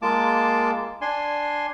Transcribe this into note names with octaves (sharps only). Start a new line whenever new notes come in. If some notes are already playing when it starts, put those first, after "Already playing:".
G#3 A#3 F4 A5 D6
D4 G#5 C6